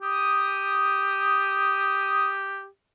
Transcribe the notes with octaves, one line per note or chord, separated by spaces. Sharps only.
G4 D#6